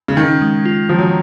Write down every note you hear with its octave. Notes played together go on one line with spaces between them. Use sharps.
C#3
D#3 C#4
G#3
F4
D#3 F3
F#3